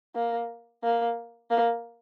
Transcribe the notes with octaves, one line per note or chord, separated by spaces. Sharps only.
A#3
A#3
A#3